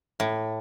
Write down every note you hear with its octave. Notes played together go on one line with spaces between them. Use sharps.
A2